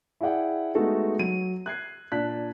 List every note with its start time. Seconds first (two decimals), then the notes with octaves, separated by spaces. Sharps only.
0.21 E4 G#4 D5 F#5 G5
0.75 G#3 A3 B3 D#4 F#4 A4
1.19 F#3 D#7
1.66 F#6 G#6 C7
2.12 A#2 D4 D5 A5 F#6 B6